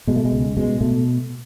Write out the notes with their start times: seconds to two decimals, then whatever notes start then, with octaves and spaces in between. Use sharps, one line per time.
0.07 B2 G#3
0.16 A3
0.25 G#3
0.32 C#2
0.57 B2 G#3
0.81 B2 A3